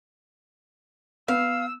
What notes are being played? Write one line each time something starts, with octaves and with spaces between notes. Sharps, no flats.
B3 F5 E6